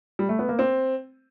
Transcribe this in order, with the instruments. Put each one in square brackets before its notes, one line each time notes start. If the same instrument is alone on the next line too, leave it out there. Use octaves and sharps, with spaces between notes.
[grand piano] G3
A3
B3
A#3
C4